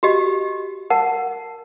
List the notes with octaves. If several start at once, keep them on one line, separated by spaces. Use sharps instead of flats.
F#4 G4 D#5
A#4 F#5 A5